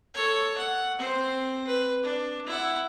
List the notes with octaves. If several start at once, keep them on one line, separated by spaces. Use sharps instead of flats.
A4 C#5
F#5
C4 C5
B4
D4
E4 F#5